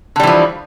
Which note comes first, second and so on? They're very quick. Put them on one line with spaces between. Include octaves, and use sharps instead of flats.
D3 G3 E3 F3